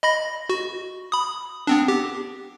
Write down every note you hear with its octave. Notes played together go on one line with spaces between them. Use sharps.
D#5 B5 A#6
F#4
B5 D#6
B3 C4 D4
G4